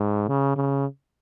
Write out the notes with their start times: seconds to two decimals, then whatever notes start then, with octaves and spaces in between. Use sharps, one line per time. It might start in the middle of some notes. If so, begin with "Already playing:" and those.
Already playing: G#2
0.28 C#3
0.56 C#3